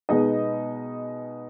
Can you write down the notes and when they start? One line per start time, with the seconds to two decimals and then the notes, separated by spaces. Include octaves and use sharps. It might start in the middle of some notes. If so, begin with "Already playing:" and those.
0.09 B2 G#3 B3 D#4 D#5